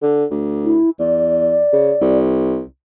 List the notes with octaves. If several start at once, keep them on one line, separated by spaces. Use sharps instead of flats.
D3
D2
E4
E2 D5
C#3
C2